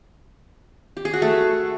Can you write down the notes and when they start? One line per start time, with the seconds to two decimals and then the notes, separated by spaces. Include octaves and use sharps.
0.97 G4
1.05 G#4
1.13 F#4
1.22 A3